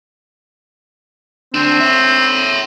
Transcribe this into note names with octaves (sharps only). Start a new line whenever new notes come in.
D2 C4 D4
C#5 E5